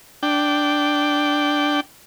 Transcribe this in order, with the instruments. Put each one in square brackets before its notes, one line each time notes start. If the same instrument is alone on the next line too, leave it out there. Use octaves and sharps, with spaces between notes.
[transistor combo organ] D4 G5